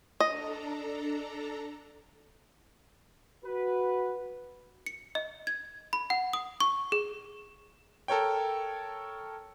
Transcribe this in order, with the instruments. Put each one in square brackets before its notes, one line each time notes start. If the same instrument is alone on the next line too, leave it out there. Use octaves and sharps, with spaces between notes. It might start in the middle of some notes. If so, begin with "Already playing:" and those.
[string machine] D4 A4 A#5 [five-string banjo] D#5
[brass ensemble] F#4 B4
[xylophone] C#7
D#5
G#6
B5
F#5
D#6
C#6
G#4
[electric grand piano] A4 A#4 C#5 G5